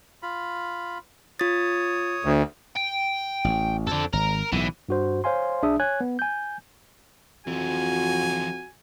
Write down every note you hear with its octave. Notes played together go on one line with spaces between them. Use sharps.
F4 B5
F4 C#5 D#6 A6
D2
G5
A1
F2 D4 A4
G#1 A#4
B1 A2 E3
G2 F#4 C5
C5 C#5 F5 G#5 C6
B1 D4 G#4 E5 D#6
C#5 G#5 F#6 G#6
B3
G#5 G6
F2 E3 F3 F#4 G#5